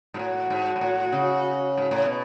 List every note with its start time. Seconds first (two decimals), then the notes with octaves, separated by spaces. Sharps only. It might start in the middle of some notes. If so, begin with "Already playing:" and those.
0.14 G#2
0.19 A2 F#4
0.50 G#2
0.76 G#2
0.81 A2
1.12 C#3
1.77 G#2
1.91 A2
2.05 B2